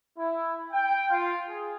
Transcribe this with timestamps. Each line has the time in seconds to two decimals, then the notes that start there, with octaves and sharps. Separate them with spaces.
0.18 E4
0.71 G5
1.10 F4
1.47 G#4